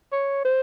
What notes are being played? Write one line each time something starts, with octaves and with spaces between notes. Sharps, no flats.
C#5
C5